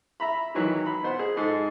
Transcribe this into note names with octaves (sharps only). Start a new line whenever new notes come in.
E5 A#5 B5
G#2 D#3 E3 F#3
B5
B2 C5 F#5
G#4
G#2 A4